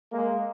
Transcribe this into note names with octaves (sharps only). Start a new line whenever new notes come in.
G#3 A#3